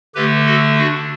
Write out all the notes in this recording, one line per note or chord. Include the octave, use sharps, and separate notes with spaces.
D3 A3 G4 B4
F#4 A4
D4 F#4